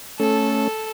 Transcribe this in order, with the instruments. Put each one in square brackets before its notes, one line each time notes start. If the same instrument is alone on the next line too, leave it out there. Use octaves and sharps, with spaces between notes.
[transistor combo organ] A3 C#4 [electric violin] A4